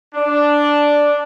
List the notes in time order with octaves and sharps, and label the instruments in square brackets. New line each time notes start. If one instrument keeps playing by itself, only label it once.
[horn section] D4